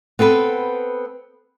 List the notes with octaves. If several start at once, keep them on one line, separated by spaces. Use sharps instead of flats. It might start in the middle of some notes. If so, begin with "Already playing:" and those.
B3 C4 A4 B4